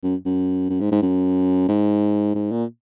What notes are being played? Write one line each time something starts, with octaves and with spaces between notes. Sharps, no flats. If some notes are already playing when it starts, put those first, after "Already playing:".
F#2
F#2
F#2
G#2
G#2
F#2
G#2
G#2
A#2